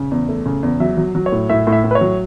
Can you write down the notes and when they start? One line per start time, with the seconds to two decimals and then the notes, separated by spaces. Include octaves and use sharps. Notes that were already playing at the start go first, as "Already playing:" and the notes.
Already playing: C#3
0.11 E2
0.29 A3
0.46 C#3
0.63 E2
0.80 F#3 E5
0.97 F#3
1.15 F#3
1.26 C#5
1.32 A2
1.49 A2 E5
1.67 A2
1.72 E5
1.84 A2
1.91 B4
1.95 C#5
2.01 F#3